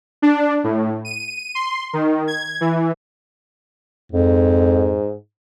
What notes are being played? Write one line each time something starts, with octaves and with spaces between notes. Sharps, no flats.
D4
A2
D#7
C6
D#3
G#6
E3
F2 G#2